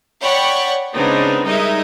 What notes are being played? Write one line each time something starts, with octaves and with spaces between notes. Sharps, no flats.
C#5 D5 F#5 G5 B5 C#6
C#3 G#3 B3 C4 D4 D#4
G3 G#3 D#4 A#4 D#5 E5